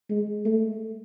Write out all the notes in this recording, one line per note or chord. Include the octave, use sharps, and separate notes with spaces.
G#3
A3